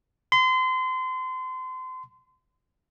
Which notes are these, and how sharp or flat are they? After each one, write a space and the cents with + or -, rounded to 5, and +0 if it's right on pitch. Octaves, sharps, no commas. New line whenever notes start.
C6 -30